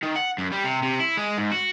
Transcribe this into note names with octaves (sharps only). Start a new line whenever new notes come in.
D#3
F#5
F#2
G3
C3
C3
E4
G#3
G#2
F#4